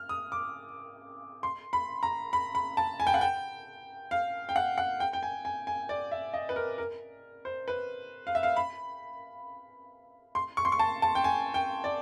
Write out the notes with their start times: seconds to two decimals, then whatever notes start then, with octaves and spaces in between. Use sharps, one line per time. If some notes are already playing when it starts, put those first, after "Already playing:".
Already playing: F6
0.09 D#6
0.32 D6
1.43 C6
1.73 B5
2.03 A#5
2.33 B5
2.55 B5
2.77 A5
3.00 G#5
3.07 G5
3.14 F#5
3.21 G5
4.11 F5
4.49 G5
4.56 F#5
4.78 F#5
5.00 G5
5.13 G5
5.23 G#5
5.45 G#5
5.67 G#5
5.89 D5
6.11 E5
6.34 D#5
6.49 B4
6.56 A#4
6.78 A#4
7.45 C5
7.68 B4
8.27 F5
8.35 E5
8.43 F5
8.56 B5
10.35 C6
10.57 C#6
10.65 C6
10.72 C#6
10.79 A5
11.02 A5
11.15 G5
11.24 G#5
11.54 G5
11.84 D5